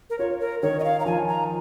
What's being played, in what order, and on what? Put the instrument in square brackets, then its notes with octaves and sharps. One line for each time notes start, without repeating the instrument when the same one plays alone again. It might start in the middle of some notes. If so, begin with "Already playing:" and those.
[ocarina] A#4
[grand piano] F4 [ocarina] C#5
[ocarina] A#4
[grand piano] D#3 [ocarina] C#5
[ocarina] D#5
F5
A#5
[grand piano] F3 [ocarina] G#5
[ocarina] A#5